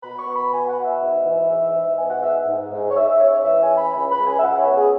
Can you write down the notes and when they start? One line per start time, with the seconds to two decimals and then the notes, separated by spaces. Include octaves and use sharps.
0.03 B2 B5
0.19 C#6
0.27 B3
0.36 B5
0.52 B2 G#5
0.68 F#5
0.76 B2
0.85 E5
1.01 G#2
1.26 E3
1.50 G#2
1.74 G#2
1.98 B3 G#5
2.10 F#5
2.23 G#2 E5
2.48 G#2
2.73 G#2
2.90 C#5
2.96 G#2 E5
3.09 E5
3.21 C#4 C#5
3.33 C#5
3.45 E3 E5
3.62 G#5
3.70 C#4
3.78 B5
3.94 C#2 B5
4.10 B5
4.18 C#2
4.26 G#5
4.38 E5
4.42 C#2 F#5
4.59 C#5
4.68 B3
4.75 G#4